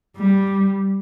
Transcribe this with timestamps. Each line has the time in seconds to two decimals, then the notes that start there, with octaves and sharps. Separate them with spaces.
0.17 G3